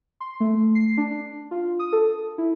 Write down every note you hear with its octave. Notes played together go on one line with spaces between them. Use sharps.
C6
A3
C7
D4
F4
D#6
A4
E4